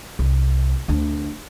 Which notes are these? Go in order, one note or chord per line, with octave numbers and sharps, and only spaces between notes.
C2
D2 D4